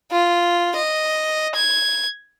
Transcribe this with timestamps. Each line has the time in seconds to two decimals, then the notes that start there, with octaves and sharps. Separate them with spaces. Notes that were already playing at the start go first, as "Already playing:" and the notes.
0.12 F4
0.76 D#5
1.55 G#6